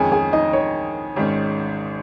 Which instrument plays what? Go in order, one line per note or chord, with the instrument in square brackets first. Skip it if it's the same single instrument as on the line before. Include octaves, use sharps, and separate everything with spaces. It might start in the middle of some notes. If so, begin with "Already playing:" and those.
Already playing: [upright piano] F2 D#3 G#3 C#4 [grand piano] G#4 G#5
[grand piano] G#4 G#5
D#4 D#5
C#5
[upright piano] G#1 G#2 D#3 C#4